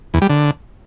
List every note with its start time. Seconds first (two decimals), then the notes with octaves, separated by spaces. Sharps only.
0.14 E2
0.22 G3
0.29 D3